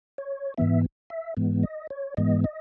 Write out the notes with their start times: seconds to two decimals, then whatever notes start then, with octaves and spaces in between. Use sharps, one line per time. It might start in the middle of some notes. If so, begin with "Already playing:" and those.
0.18 C#5
0.58 G#2 E3 B3 E5
1.10 E5
1.37 G#2 E3 G#3 B3
1.63 D#5
1.90 C#5
2.17 G#2 E3 G#3 B3 D#5
2.44 D#5